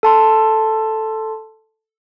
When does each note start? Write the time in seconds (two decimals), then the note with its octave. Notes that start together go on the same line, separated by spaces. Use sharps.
0.03 A4 A5 C6